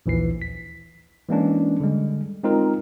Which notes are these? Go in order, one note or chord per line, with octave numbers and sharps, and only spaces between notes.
A#1 D#2 E3 F3 C7
B6
E3 G#3 A#3 C#4 D4
D3 G3 G#3
G#3 C4 D#4 F4 A#4